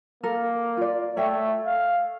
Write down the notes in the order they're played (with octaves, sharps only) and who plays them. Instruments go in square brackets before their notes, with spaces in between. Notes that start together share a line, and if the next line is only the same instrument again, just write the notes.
[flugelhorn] A#3 [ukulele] A4 A#4
[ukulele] F4 D5
[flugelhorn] A3 [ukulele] C#5 E5 G5
[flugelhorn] F5